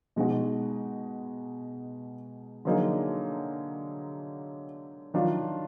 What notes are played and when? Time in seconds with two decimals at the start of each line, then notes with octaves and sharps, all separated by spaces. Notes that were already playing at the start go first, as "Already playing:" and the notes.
0.16 B2 G#3 D#4 F#4
2.65 D3 F#3 A#3 D#4 G#4
5.14 D#3 F#3 D4 F4